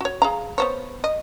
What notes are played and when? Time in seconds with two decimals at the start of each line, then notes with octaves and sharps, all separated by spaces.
0.01 F#4 C#5
0.22 G#4 F5 A#5
0.58 B3 C5 C#5
1.04 D#5